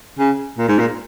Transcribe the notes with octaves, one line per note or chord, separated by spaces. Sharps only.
C#3
A#2
G#2
A#2